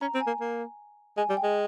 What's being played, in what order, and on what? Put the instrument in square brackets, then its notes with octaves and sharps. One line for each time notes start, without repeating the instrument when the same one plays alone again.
[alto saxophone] C#4 [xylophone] A#5
[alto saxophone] C4
[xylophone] G#5
[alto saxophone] A#3
A#3
[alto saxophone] G#3 [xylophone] G#5
[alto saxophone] G3
[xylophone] G5
[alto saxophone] G#3